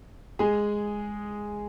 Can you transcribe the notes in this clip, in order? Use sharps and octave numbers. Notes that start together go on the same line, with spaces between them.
G#3 G#4